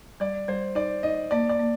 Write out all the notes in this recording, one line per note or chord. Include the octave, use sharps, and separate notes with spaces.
G3 D5
G3 C5
D#4 D5
D#4 D#5
A#3 D5
D5
A#3